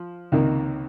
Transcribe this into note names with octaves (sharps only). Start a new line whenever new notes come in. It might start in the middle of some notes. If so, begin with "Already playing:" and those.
Already playing: F3
C#2 C3 D#3 A#3